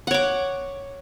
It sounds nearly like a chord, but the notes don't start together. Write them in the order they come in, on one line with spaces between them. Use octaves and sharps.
F#5 C#5 D6